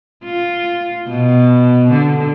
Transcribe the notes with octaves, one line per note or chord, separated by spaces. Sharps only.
F4
B2
D3